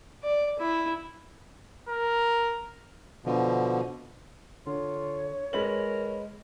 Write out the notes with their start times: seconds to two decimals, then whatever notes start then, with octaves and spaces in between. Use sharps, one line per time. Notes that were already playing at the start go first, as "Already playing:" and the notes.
0.23 D5
0.59 E4
1.89 A#4
3.25 B2 D3 F3
4.67 D3 F4 C#5
5.53 G#3 A#4 B4 B5 F#7